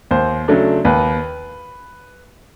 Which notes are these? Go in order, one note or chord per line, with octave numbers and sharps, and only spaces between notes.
D#2 C5
C#3 F#3 A3 D4
D#2 B4